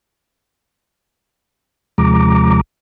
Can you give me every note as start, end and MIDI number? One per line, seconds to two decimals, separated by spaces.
1.98 2.61 39
1.98 2.61 48
1.98 2.61 53
1.98 2.61 56
1.98 2.61 82
1.98 2.61 86